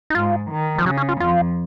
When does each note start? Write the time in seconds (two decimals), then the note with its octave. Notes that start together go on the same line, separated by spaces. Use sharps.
0.10 D#4
0.15 G#2 F4
0.51 D#3
0.78 F3
0.85 C#3 F#3
0.97 C#4
1.09 F4
1.20 F2 F4